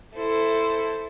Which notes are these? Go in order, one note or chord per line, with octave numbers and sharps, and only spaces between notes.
E4 A4 C5